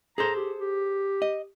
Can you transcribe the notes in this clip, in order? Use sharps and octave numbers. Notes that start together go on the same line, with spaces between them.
G#4 A4 C5 A#5
G4
G4
D#5